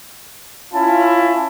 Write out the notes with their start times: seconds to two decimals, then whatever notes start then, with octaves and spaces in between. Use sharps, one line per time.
0.73 C#4 E4 F4 A5